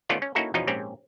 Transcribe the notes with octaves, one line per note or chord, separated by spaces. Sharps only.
D#3 A3 B3 C#4 F4 D5
C#4
A#3 C#4 D#4 E4 F#4 A4
E2 B2 F3 C#4 D#4
A#1 G#2 C4 C#4 G4